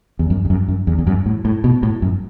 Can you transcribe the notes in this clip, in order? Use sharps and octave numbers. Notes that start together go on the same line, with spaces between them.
E2
F#2
E2
F#2
F#2
E2
E2
F#2
A2
A2
B2
A2
F#2